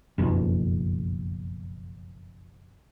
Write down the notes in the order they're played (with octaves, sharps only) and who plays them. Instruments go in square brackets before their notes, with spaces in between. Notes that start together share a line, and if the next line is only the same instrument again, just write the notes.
[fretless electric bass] F#1 B1 F2